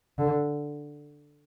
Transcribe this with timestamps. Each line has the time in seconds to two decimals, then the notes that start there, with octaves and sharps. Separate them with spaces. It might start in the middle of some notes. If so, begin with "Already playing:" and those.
0.18 D3